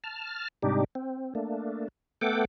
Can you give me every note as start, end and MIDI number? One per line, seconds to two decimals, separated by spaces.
0.04 0.48 81
0.04 0.48 89
0.63 0.84 44
0.63 0.84 48
0.63 0.84 55
0.63 0.84 62
0.63 0.84 63
0.63 0.84 67
0.95 1.34 60
1.35 1.88 57
1.35 1.88 58
1.35 1.88 62
2.21 2.45 57
2.21 2.45 59
2.21 2.45 69
2.21 2.45 78
2.21 2.45 79
2.21 2.45 86